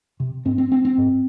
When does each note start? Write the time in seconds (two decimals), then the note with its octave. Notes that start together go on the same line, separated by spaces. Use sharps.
0.20 C3
0.45 G#2 C4
0.58 C4
0.72 C4
0.85 C4
0.98 G#2